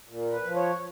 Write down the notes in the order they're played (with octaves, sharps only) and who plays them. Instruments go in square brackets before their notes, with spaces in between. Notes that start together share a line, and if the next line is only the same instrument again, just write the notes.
[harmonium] A#2
B4
F3
C#5